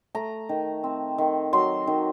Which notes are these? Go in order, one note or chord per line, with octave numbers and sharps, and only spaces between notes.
A3 A#5
D#3
C4
D#3
F#3 C6
D#3